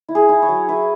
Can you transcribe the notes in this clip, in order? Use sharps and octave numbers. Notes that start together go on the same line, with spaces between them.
E4
G#4
E4
C#5
F#3
E4 B4